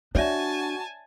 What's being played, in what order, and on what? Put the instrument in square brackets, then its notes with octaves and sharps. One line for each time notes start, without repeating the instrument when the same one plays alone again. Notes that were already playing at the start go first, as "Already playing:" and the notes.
[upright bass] D4 [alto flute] F#4 [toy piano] C#5 D5 E5 [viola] G#5 A5